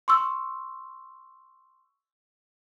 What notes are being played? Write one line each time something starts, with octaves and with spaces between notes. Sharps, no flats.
C6 C#6 E6